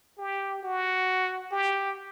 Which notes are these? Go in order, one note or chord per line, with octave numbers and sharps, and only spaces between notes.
G4
F#4
G4